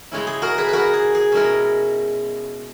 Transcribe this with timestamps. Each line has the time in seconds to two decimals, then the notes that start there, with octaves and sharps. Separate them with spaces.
0.12 C#3 G#3 C#4 E4
0.27 G#4
0.42 F#4 A#4
0.58 G#4 B4
0.69 F#4 A#4 B4
0.93 G#4
1.15 G#4
1.32 B2 G#3 C#4 E4 A#4